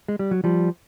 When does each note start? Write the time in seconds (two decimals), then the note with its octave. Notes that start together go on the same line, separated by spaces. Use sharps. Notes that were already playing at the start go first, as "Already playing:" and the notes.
0.08 G#3
0.19 G3
0.31 F#3
0.44 F3 G3